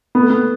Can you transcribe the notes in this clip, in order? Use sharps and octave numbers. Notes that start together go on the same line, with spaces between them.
B3
A3
B3